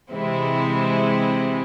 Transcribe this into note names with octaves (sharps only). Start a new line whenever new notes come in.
C3 E3 G#3 C4 E4